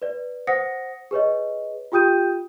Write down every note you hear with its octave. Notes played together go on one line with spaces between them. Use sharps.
B4 D5
C5 F#5 D#6 A#6 C#7
G#4 B4 C#5 D#5
F4 G4 G5 D#6 G6 D#7